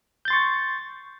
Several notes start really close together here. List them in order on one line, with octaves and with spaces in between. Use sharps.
G6 A6 C6 C#6